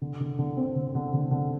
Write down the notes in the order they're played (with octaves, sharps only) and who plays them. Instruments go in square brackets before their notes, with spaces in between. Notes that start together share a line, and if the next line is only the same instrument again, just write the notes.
[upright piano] D3
D3
D3
C4
D3
D3
D3
D3